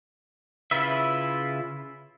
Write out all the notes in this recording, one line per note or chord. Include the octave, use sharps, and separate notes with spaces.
C#3 E4 F4 B4 E5